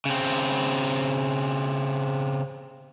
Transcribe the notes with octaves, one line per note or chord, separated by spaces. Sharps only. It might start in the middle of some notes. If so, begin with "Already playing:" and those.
C#3 C4